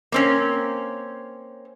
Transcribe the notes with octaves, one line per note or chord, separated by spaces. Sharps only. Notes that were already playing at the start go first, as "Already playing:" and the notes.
A#3 C4 C#4